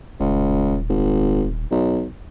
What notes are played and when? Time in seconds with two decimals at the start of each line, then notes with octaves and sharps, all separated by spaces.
0.20 D#1 C#2
0.89 G#1
1.71 B1